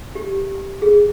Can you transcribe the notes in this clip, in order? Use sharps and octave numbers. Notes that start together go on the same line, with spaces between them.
G4
G#4